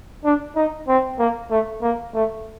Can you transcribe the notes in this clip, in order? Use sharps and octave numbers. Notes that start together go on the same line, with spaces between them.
D4
D#4
C4
A#3
A3
A#3
A3